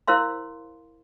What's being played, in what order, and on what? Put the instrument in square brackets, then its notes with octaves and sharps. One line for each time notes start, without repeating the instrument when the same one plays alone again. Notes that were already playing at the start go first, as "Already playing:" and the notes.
[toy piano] E4 A#4 C5 F5 C6